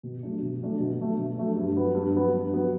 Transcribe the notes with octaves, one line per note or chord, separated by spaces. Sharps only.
B2
F#3 A3 D4
B2
F#3 A3 D4
B2
F#3 A3 D4
B2
F#3 A3 D4
G2
F#3 B3
G2
F#3 B3
G2
F#3 B3